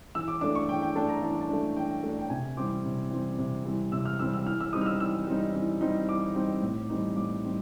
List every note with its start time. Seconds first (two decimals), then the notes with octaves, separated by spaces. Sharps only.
0.15 E3 E6
0.28 D6
0.41 A3 D4 D6
0.55 C#6
0.68 E3 G5
0.82 G5
0.95 A3 D4 A5
1.09 A#5
1.22 E3 A5
1.41 A5
1.49 A3 D4
1.76 E3 G5
2.03 A3 D4
2.19 G5
2.30 C3 G#5
2.57 E3 G3 C4 D6
2.85 C3
3.11 E3 G3 C4
3.38 C3
3.65 E3 G3 C4
3.92 C3 E6
4.05 F6
4.19 E3 G3 C4 E6
4.34 E6
4.46 E3 F6
4.61 E6
4.73 G3 C4 D#4 D#6
4.81 F6
4.86 E6
5.00 E3 E6
5.27 G3 C4 D#4
5.54 E3
5.81 G3 C4 D#4
6.09 E3 D6
6.35 G3 C4 D#4
6.62 A2
6.89 E3 G3 C4 D#4
7.17 A2 D6
7.43 G3 C4 D#4